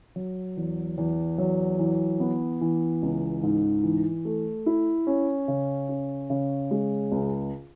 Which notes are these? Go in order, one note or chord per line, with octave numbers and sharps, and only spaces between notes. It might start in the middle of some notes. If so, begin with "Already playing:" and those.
F#3
E2
E2
F#3
E3
B3
E3
C#2
G#2
E3
A3
E4
C#4
C#3
C#4
C#3
G#3
C#2